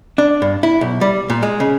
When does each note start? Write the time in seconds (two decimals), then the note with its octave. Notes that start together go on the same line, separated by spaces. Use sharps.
0.18 D4
0.42 G2
0.63 E4
0.81 B1
1.01 G3
1.30 A#2
1.43 G#3
1.60 C#3